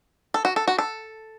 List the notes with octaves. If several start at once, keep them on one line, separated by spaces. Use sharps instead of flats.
A4
F#4
A4
F#4
A4